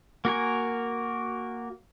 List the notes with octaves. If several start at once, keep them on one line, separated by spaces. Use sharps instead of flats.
A#3 F#4 A#4 G#5